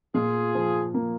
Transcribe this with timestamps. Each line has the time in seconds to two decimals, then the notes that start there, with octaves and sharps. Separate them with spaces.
0.15 A#2 F4 G#4
0.55 F3
0.94 A#3